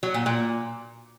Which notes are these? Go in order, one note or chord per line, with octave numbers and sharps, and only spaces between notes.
F#3
A#2
A#2